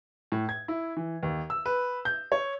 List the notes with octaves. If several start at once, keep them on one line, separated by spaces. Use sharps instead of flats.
A2
G#6
E4
E3
D#2
E6
B4
G6
C#5